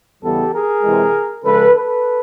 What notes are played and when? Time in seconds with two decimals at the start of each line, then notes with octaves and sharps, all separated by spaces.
0.23 E2 C#3 E3 G3 B3 G4 A4
0.53 G#4 A#4
0.84 C3 E3 G#3
1.44 C#3 F3 G#3 A4 B4
1.74 A4 B4